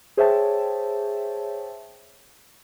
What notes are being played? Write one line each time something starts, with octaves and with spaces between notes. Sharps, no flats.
G#4 C5 C#5 E5 G5 A5